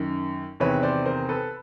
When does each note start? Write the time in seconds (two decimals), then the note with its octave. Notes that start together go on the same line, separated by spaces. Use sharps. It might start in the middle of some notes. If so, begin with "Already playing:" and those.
Already playing: F#2 D#3
0.60 E2 C3 D#3 B4 C#5
0.83 C5 D5
1.06 A#4 C5
1.29 A4 B4